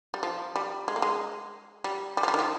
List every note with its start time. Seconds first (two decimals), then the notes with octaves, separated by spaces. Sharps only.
0.14 G3
0.23 F3
0.56 G3
0.88 G#3
0.96 A#3
1.02 G#3
1.84 G3
2.17 G3
2.23 F3
2.28 G3
2.34 D#3
2.39 F3